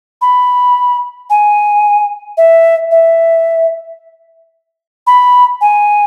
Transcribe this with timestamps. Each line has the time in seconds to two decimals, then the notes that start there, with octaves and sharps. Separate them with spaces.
0.22 B5
1.30 G#5
2.37 E5
2.91 E5
5.07 B5
5.61 G#5